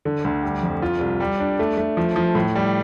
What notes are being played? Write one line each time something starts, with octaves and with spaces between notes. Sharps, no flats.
D3
D2
G3
F2
F4
C2
G3
D4
A3
A3
F3
F3
A2
G3